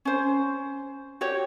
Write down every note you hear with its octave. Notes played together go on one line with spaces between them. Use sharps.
C#4 C5
F#4 G4 C#5